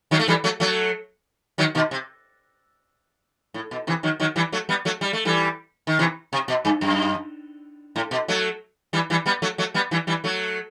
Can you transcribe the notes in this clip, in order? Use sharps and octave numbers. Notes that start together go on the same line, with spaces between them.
D#3 F#3
A3
E3 G3
F#3 A3
F#3 A3
D#3 F#3
B2 D#3
C3
A2
B2
C3 E3
D#3 F#3
D#3 F#3
E3 G3
F#3 A3
G3 B3
F#3 A3
G3
A3
E3 G3
D#3
C3 E3
C3
B2
G2
F#2
A2
B2
F#3 A3
E3 G3
E3 G3
G3 B3
F#3 A3
F#3 A3
G3 B3
E3 G3
E3 G3
F#3 A3